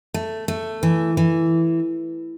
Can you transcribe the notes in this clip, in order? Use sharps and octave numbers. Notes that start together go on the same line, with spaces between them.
A3
A3
E3
E3